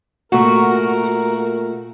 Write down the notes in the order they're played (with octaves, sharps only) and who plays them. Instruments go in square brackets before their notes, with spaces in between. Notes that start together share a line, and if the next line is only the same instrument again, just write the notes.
[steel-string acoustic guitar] A#2 A3 [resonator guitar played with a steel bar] F#4 [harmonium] A#4